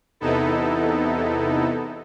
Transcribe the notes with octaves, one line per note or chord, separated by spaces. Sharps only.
E2 C3 B3 D#4 E4 A4